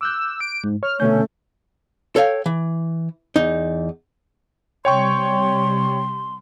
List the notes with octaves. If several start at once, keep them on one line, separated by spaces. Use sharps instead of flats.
D6 E6 F#6 G6
D7
G#2
C#5 F6
B2 D3 A3 C#4 G6
A4 C#5 F5 G5
E3
E2 D#4
C3 G3 C#5 G5 C6 C#6